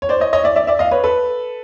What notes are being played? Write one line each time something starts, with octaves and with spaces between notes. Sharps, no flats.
C#5
C5 D5
C#5 D#5
C#5 D#5
D5 E5
D5 E5
D5 E5
D#5 F5
B4 C#5
A4 B4